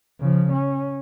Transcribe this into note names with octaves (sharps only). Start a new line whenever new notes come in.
C#3 F3
C#4